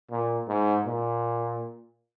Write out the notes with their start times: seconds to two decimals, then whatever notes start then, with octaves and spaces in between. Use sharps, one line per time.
0.11 A#2
0.48 G#2
0.86 A#2